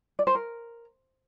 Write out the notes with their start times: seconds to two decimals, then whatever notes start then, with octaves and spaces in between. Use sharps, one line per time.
0.19 D5
0.27 C5
0.35 A#4